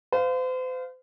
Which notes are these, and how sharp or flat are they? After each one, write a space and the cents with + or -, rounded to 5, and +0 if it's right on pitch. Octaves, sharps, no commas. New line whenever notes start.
C5 -40 F5 +5